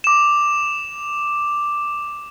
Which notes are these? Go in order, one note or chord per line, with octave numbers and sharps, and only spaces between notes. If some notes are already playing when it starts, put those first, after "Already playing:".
D6 E7